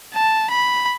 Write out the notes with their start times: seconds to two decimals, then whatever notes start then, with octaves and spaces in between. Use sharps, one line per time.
0.14 A5
0.50 B5